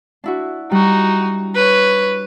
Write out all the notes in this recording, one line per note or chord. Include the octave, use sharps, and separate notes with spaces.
D4 E4 F#4
G3 D#4 F#4
B4 C#5